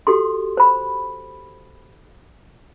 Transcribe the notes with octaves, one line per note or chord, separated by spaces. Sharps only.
F#4 G4 A4 C6
C5 B5